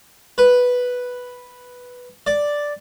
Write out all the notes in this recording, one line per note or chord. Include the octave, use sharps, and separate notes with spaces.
B4
D5